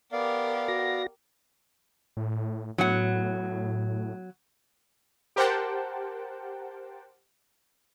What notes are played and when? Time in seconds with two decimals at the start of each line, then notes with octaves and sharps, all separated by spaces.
0.12 B3 G4 A#4 D5 F5
0.68 F#4 A#6
2.17 A2
2.78 A2 F#3 B3 F#5
5.36 G4 A#4 C5 F#5 G5 A5